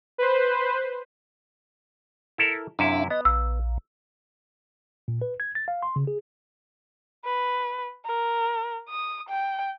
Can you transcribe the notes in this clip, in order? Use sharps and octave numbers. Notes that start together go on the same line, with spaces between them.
B4 C5
E4 A4 A#4
F#2 C3 D4 E4 E5 F5
B3 D#5
A#1 E6
A#2
B4
G#6
A6
F5
C6
C#3
G#4
B4
A#4
D#6
G5